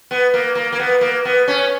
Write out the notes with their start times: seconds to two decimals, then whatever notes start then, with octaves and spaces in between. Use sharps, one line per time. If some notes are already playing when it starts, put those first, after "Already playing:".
0.11 B3
0.34 A#3
0.55 A#3
0.72 A#3
0.79 B3
1.01 A#3
1.25 B3
1.48 C#4